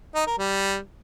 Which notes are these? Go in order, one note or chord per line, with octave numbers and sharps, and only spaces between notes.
D#4
A#4
G3